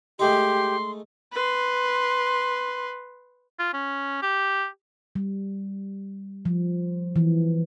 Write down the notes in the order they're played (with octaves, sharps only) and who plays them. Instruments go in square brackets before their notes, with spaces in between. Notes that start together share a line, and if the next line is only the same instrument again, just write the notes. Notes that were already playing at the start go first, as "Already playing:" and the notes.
[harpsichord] G#3 A3 D#4 [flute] G4 [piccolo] C6
[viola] B4 C6
[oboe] F4
C#4
G4
[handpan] G3
F3
E3